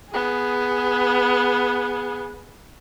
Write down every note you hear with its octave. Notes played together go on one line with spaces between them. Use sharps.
B3 G#4